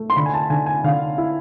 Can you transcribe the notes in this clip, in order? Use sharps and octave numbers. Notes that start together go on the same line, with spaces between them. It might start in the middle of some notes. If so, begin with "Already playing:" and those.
Already playing: A3
C6
D3 B5
G#5
A5
D3 G#5
G#5
D3 F5
E4